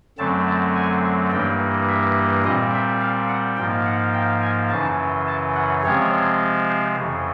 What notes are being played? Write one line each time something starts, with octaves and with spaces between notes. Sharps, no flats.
F#2 D3 F#3 A3 C4 A5
A5
G#5
G2 E3 G3 A#3 G5
E5
A#2 G3 C4 D#5
E5
F5
F#5
G#2 F3 A#3 G5
F#5
G5
G#5
F#2 C#3 E3 A5
A5
F#5
C3 F3 G#3 C4 C#5
C5
F2 C#3 E3